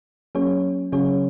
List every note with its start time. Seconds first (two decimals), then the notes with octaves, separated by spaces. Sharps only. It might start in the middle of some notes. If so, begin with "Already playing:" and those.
0.35 F#3 A#3 C#4 G#4 C#5
0.92 C#3 F#3 C#4 G#4 C#5